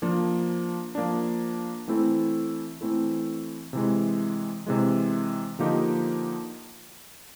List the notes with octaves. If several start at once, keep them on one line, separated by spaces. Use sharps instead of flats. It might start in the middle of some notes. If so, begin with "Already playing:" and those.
F3 A#3 D4
F3 A#3 D4
E3 A3 C4 E4 A4
E3 A3 C4 E4 A4
C3 E3 G#3
C3 E3 G#3
D3 F3 A#3 D#4 G4